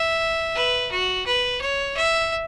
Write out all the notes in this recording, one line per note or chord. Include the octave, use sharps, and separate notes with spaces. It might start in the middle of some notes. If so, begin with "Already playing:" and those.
Already playing: E5
B4
F#4
B4
C#5
E5